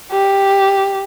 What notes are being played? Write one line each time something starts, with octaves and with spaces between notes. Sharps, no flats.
G4